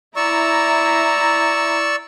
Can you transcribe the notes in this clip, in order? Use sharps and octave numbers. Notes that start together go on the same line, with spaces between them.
E4 D5 A#5 C#6 E6